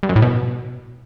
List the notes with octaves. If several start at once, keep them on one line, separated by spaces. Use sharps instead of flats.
G2
F#2
A2
B2